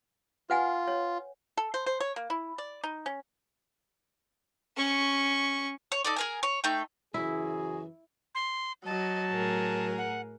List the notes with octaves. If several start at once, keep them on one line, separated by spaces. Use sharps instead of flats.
F4 B4 F#5 G#5
C#5
A4
C5
C5
C#5
A#3
E4
D5
D#4
C#4
C#4 C#6
C#5
D#4 A4 D5
G#4 A#4 G#5
C#5
A3 D#4 G5
F#2 C#3 E3 E4 F#4 G#4
C6
F#3 D#5 A5
A2 G#4 A#4
F#5